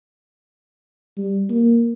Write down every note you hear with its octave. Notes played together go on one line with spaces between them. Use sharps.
G3
A#3